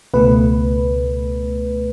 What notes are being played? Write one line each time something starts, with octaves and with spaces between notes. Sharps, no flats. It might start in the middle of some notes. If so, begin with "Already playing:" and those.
C#2 B2 A3 B4